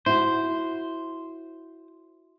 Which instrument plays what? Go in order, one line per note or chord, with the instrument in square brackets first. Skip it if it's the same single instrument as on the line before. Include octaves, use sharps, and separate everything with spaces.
[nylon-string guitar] E4 F#4 [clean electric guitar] C5